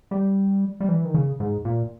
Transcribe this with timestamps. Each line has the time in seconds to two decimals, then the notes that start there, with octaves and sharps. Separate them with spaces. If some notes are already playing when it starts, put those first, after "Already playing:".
0.11 G3
0.80 G3
0.89 E3
1.05 D#3
1.14 C#3
1.40 G#2
1.65 A#2